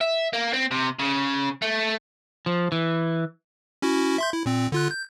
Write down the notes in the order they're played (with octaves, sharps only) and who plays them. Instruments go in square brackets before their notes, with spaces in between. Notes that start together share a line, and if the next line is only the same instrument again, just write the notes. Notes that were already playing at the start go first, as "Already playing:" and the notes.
[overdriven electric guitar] E5
A#3
C4
C3
C#3
A3
[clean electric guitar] F3
E3
[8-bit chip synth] C#4 E4 F#4
E5 C6 G6
E4
A#2 C4
D3 F4 F#6
G6